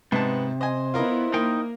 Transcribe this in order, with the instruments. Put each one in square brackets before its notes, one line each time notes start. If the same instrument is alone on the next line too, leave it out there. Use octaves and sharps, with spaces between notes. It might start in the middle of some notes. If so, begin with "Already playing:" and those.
[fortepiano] G#2 A5 [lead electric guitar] C3 [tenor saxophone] B3
[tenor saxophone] C5 [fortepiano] D#5 G#5
[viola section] B3 E4 [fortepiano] F4 A#4 D#5
[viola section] A#3 [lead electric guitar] D#4 G5 [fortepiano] A#4